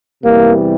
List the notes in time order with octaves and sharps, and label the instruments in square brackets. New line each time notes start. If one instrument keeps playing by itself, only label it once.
[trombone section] E2 C3 E3 G3 A#3